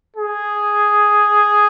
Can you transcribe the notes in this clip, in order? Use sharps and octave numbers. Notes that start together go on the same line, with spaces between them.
G#4